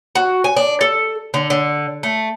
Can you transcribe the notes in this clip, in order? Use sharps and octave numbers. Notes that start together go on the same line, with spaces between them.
F#4
G#5
D4
A4
D3
D3
A3